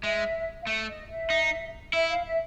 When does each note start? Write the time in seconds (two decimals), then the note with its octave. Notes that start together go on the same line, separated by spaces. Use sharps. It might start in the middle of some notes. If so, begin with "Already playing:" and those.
0.03 G#3 E5
0.61 F5
0.66 A3 E5
0.88 D#5
1.08 E5
1.30 D#4
1.93 E4 E5
2.09 F5
2.25 E5